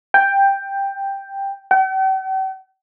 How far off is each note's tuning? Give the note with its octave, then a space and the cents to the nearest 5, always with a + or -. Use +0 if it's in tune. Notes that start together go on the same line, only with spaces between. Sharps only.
G5 +5
G5 -45